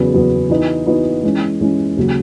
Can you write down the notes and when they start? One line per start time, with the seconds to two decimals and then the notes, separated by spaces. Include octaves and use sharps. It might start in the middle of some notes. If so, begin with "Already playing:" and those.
Already playing: E2 C#3 F#3 B3
0.14 E2 C#3 F#3 B3
0.50 E3 B3 D#4 F#4 B4
0.87 E3 B3 D#4 F#4 B4
1.23 E3 G#3 C#4
1.61 E3 G#3 C#4
1.97 D#2 C#3 F#3